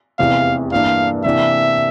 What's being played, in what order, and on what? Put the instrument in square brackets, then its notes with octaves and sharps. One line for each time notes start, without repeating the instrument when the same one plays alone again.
[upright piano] F1 E2 C3 E3 [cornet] F5
[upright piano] G2 E3 A#3 D4 [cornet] F5
[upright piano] C3 E3 A#3 D4 [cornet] E5